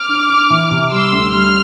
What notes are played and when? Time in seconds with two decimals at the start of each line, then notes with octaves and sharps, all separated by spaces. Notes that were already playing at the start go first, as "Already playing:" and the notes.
Already playing: D6 F6
0.09 D4
0.30 D4
0.50 E3
0.71 C3
0.92 G3 C6 E6
1.12 D2
1.33 G3 F6